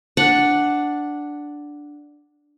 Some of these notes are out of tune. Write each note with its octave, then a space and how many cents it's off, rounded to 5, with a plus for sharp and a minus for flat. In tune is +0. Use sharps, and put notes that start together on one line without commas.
D4 +0 F#5 +0